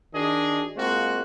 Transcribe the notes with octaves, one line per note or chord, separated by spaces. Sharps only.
D#3 D4 F#4 G#4 D#5
G#3 A#3 C4 F4 F#4